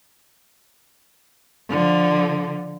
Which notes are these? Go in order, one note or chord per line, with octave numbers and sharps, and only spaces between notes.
D3 F3